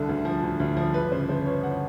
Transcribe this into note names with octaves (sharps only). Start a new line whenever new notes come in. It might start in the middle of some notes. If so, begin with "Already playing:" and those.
Already playing: C2 D3 A4
D2
F3
D2
D2
F3
G1 B4
C#3 C5
G1 C5
G1 C#5
F#5